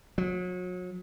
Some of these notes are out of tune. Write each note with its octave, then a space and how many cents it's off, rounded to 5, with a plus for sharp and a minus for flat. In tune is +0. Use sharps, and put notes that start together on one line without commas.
F#3 -35